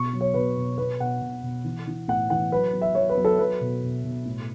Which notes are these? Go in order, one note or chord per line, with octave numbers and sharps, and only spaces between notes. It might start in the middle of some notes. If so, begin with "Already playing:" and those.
Already playing: B2 C#6
F#3
C#5
B2 B4
B2
B2 B4
B2 F#5
B2
B2
E3
E3
A2 F#5
E3 F#5
F#3 B4
F#3
E5
F#3 C#5
B4
F#3
A4
F#3 B4
B2
B2
B2
A2